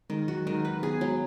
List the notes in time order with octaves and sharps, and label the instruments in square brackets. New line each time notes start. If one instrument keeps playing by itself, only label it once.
[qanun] D#3 [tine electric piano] G#3
[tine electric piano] F#3 [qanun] F#4
[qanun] D#3 [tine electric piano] G#3
[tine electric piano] G#3 [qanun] B4
[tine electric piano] B3 [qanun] G#4
[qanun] F#3 [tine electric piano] G#3